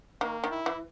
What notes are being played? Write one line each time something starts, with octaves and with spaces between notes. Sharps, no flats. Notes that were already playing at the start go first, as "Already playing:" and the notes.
D#3 A#3
D#3
E4
E3